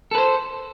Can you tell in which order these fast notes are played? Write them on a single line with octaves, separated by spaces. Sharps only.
A4 B4 C5